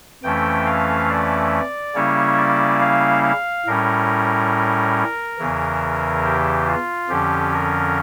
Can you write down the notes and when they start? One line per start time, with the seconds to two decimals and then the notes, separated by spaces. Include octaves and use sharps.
0.23 F2 E3 A3 C#4 G5
0.66 F5
1.09 D5
1.95 C#3 G3 A#3 C#4 E4 C#5
2.38 D5
2.81 F5
3.24 F5
3.66 A2 G3 C#4 A#4
5.38 E2 C#3 E3
6.24 G4
6.67 F4
7.09 F2 D3 F3 C#4 G4
7.53 A#4